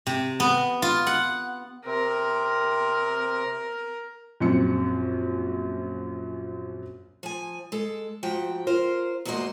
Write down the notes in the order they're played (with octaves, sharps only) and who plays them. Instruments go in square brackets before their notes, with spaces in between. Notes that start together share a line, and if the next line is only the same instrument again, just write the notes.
[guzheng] C3
B3
F4
F#5
[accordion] C3 C4 [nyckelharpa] A#4
[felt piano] A#1 F#2 C4 C#7
[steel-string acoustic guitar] F3 G#5
G#3 A4
G#2 F3 F#4 G5
F4 A#4 C5
E2 G#2 A#3 F#4 C5 D#5